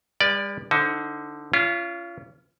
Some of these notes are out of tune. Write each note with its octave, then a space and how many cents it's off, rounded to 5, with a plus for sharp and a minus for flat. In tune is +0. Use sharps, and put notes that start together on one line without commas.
G3 +45 B4 -20 D5 +0
D3 +5 D#4 +30 C5 +0
C#4 +25 F4 -25